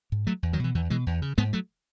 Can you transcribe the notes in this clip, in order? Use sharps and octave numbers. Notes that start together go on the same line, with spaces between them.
G#2
F#3 A3
E2
D#3 F#3
B2 E3
E2 E3
B2 E3 G#3
E2
C#3
G#2 G#3 B3
F#3 A3